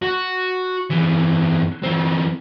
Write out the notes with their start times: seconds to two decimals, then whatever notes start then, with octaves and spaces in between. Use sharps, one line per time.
0.03 F#4
0.90 F2 E3
1.83 E2 C4